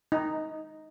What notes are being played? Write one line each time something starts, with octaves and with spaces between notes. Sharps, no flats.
D#4